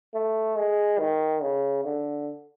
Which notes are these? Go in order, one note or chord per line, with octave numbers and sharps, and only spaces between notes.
A3
G#3
D#3
C#3
D3